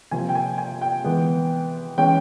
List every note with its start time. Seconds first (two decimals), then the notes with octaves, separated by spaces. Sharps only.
0.11 C3 F3 A#3 G#5
0.29 G5
0.35 G#5
0.58 G#5
0.82 G5
1.04 E3 G#3 B3
1.98 E3 G#3 C#4 G5